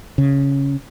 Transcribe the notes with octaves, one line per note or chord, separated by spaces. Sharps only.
C#3